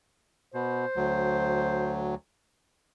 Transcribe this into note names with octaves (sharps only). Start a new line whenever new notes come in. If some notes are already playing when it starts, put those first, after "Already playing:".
B2 C5
D2 F#3